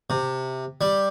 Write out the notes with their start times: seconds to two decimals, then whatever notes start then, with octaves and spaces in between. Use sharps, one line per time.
0.10 C3
0.81 G3